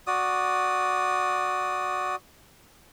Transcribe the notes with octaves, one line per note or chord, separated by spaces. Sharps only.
F#4 D5 D#6